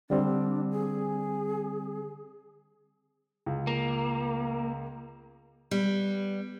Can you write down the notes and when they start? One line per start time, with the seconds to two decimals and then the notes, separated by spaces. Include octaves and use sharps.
0.10 D3 G3 C4 D4
0.71 G#4
3.46 C#2
3.67 A#3
5.71 G3 B3